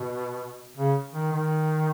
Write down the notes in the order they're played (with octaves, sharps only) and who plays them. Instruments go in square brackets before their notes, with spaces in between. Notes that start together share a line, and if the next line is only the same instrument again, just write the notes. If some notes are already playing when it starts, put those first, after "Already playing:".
Already playing: [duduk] B2
C#3
D#3
D#3